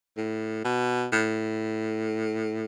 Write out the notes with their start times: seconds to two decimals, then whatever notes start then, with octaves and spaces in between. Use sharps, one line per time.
0.17 A2
0.65 B2
1.12 A2